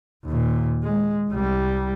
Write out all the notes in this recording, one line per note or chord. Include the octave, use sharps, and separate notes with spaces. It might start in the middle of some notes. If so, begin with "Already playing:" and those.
D#2 A#2
G#3
C2 G3